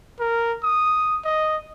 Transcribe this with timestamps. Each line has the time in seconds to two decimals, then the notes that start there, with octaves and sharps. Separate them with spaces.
0.20 A#4
0.63 D#6
1.24 D#5